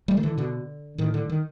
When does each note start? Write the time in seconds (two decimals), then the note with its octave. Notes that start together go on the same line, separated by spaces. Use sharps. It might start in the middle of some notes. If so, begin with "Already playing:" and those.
0.08 G3 A3
0.17 D#3
0.23 D3 E3
0.37 B2 D3
0.98 A2 D#3
1.14 D3
1.30 D#3